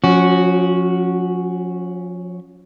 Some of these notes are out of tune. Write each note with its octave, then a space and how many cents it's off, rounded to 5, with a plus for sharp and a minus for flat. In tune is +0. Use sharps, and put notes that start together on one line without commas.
F3 +35 C#4 +0 F#4 +0